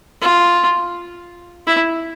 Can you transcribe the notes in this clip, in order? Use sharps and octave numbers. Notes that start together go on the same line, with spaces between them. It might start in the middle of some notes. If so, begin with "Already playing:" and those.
F4
E4